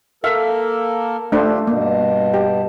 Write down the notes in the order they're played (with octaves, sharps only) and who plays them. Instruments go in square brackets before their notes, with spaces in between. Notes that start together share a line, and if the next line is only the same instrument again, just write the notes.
[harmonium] A#3 A4 A#4 [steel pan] E5 F5
[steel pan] A3 D4 C5 [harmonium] F4 G4
[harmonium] G2 B2 [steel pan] A#3
[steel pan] G4